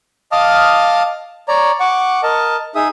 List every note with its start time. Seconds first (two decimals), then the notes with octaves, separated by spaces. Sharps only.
0.32 D#5 F5 A5 D6 D#6 F6
1.48 C#5 D5 A#5
1.80 F#5 C#6 D6
2.23 A#4 D#5 A5
2.75 D#4 G#4 E5 D#6